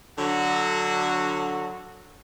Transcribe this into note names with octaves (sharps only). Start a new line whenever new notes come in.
D3 F#3 F#4